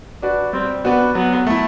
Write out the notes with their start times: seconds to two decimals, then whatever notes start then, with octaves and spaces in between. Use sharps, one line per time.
0.22 D4 F#4 B4 D5
0.53 G3 C4
0.84 B3 D4 F#4 B4 D5
1.15 F#3 B3
1.47 A3 E4